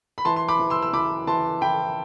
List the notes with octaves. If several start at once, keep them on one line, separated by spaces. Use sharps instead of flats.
B5
E3 A5 C6
C6
B5 D6
E3
C6 E6
E6
E3 B5 D6
E3 A5 C6
E3 G5 B5